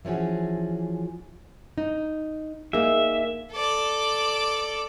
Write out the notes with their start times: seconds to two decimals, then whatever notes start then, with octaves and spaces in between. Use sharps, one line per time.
0.05 E3 F3 C#4 F#4 G#4
1.78 D#4
2.73 A#3 D#4 G#4 E5
3.52 A4 D5